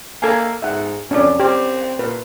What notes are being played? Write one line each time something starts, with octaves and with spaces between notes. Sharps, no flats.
A#3 A4 G#5
G#2 E5 F#5
F2 C#4 D4 D5
C4 G4
A#2 B4